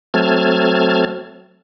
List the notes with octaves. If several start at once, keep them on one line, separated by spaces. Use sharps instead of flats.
F#3 A3 C4 A5 F6 G#6